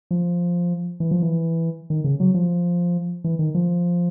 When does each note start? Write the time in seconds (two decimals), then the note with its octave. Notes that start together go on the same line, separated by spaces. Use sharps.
0.11 F3
1.00 E3
1.11 F3
1.23 E3
1.90 D#3
2.04 C#3
2.20 F#3
2.34 F3
3.24 E3
3.39 D#3
3.55 F3